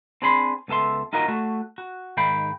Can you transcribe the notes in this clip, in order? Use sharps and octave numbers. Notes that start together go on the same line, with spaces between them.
C4 D4 G#4 B5 C6
C#2 B3 A4 E5 C6
D#4 F4 F#4 A#4 D#5
A3 F#4
F#4
G#2 D#3 G#3 F5 G5 B5